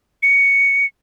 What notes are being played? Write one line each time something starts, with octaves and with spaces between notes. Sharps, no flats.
C#7